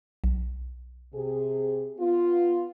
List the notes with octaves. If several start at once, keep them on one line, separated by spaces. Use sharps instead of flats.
B1
C3 G#4
B3 F4